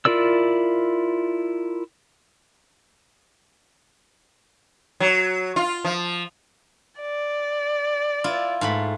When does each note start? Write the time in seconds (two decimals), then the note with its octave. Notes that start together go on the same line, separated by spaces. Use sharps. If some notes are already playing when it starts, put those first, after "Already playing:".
0.05 E4 F4 A#4 D5 E6
5.00 F#3
5.56 F4
5.84 F3
7.00 D5
8.24 E4 F4
8.61 G#2 A3 B5